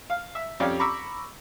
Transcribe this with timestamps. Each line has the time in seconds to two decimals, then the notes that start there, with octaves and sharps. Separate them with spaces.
0.10 F5
0.35 E5
0.60 F2 C#4 G4 D5 F5 D6
0.79 A#5 B5 C#6 D6 E6